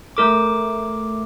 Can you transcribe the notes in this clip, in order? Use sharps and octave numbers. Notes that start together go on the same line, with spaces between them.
A3 A#4 D6